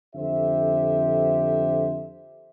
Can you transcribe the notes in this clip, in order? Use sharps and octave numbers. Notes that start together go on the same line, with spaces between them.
F2 D3 G4 C5 E5